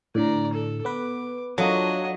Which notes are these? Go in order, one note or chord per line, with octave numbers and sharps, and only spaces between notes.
A2 D3 D5 A#5
A4
B3 B4 D6
F#3 D4 F4 A4 D#5